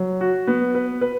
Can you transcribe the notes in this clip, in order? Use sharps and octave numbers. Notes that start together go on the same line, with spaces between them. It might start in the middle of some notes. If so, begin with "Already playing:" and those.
Already playing: F#3
F#4
B3
B4
B4